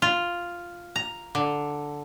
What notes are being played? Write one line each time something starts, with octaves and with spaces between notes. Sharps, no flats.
F4
A#5
D3